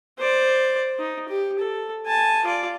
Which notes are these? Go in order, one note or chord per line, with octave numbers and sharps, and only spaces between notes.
C5 D5
D#4
G4
A4
G#5 A5
F4 D5